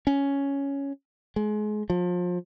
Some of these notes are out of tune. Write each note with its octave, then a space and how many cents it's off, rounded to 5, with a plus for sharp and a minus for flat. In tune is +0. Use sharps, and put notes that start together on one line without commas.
C#4 +5
G#3 +30
F3 +30